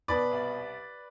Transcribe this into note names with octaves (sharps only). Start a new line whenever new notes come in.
B2 B4 D5
C2